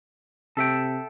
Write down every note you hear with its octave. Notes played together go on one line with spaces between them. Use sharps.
C3 A4 E5 G5